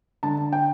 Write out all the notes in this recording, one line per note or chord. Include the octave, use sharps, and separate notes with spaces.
D3 A5
G5